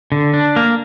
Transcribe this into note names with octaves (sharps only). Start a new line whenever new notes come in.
D3
D4
A#3